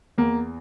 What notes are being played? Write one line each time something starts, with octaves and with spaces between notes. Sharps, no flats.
E2 A#3